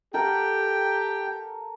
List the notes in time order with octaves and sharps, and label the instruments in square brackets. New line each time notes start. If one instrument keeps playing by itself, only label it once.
[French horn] G4 [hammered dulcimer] A4 A#4 F#5 [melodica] G5